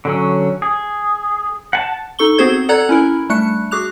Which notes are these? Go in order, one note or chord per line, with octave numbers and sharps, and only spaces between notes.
D3 F#3 C#4
G#4
F#5 G#5 A5
D#4 A4 C#6 G7
B3 C4 F#4 G#4 C5 G#6
A4 D5 F#5 A#5 F#6 G#6
C#4 E4 A#4
G3 A3 D4 F#6 C#7
F#4 G#4 D6 F#6 F7